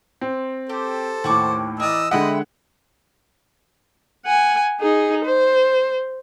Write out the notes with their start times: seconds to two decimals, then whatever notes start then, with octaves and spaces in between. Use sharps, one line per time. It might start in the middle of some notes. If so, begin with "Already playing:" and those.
0.21 C4
0.69 G4 A4 C5
1.24 D#2 A2 F#5 C#6 D6
1.80 E3 A#4 D5 D#5 E6
2.11 D3 G#3 D#5 E5 F#5 G5 B5
4.26 F#5 G#5
4.81 D#4 G#4
5.25 C5